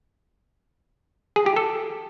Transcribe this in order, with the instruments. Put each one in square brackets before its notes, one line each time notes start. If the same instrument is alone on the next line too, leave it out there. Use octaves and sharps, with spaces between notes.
[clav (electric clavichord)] G#4
G4
A4